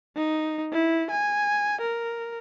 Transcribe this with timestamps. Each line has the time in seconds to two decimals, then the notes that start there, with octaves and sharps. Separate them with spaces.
0.16 D#4
0.72 E4
1.11 G#5
1.81 A#4